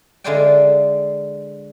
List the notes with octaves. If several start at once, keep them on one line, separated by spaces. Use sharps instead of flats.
D3 G#3 E4 F4 D5 G5